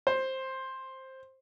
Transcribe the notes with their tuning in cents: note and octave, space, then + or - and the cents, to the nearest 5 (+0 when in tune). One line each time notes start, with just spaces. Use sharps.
C5 +10